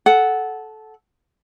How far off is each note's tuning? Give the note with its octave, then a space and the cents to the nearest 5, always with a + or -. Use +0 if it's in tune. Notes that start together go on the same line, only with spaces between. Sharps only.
A4 -15 F#5 +0